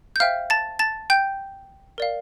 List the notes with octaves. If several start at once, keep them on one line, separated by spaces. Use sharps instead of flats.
G6
C5 E5 F5 G5 F6
A5 A6
A5 A6
G5 G6
A#4 D5 F5